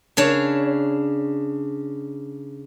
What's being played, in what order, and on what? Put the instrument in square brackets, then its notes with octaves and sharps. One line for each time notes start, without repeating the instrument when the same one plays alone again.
[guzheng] C#3 D4 C#5